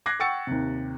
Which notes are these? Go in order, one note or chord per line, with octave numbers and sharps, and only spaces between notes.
D6 F#6 G#6 A#6 C7
F#5 G5 C#6 E6 A6 C#7
D#2 C3